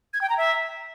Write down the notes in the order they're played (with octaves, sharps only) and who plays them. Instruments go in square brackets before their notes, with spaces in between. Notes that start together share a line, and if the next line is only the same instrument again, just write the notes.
[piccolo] G#6
G5
A#5
E5